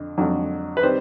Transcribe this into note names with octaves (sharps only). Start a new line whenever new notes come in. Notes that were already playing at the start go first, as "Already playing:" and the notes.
Already playing: F2 D3
F2 D3 F#3
B4
D#3 G3 C4 C5